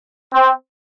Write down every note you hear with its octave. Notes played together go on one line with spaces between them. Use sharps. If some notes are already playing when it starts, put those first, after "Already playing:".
C4